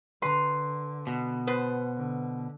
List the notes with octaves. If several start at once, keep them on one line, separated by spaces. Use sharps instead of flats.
D3 B4 A#5 C6
B2
B3 B4 C5
D3